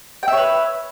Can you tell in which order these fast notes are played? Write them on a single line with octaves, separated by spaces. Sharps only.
G5 E5 C#5 B4